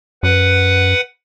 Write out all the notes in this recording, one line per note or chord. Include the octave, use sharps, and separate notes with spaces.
F#2 B4 F#5